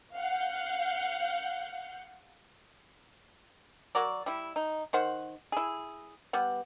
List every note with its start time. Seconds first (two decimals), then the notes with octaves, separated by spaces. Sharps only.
0.15 F5 F#5 G6
3.95 F#3 F#4 A#4 D5
4.26 G3 E4
4.56 D#4
4.93 D#3 C5 F#5
5.52 E4 G#4
6.33 G3 B3 F#5